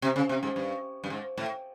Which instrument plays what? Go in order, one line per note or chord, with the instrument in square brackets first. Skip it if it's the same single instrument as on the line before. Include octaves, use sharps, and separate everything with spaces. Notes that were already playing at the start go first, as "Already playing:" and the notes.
[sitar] C3
C#3
C3
G#2
G2
G2
G#2
A2